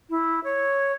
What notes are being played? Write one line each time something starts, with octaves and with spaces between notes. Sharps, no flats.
E4
C#5